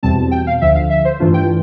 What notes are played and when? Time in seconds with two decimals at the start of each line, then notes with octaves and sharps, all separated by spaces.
0.03 E2 B2 G3 C4 A5
0.31 G5
0.47 F5
0.61 D2 D3 F3 E5
0.75 F5
0.90 E5
1.05 C5
1.20 G2 E3 A3 D4 F4
1.34 G5